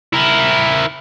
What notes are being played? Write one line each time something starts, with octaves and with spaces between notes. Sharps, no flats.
E4 A#4